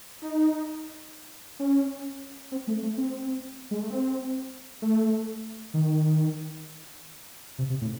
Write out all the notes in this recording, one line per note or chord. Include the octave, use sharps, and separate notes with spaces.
D#4
C#4
C4
A3
A3
C4
G#3
A3
C4
A3
D#3
C3
C3
A2